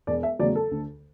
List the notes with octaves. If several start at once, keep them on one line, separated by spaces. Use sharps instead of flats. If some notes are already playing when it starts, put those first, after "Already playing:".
E1 D5
E5
E2 C#3 F#3 A3 D5
A4
D2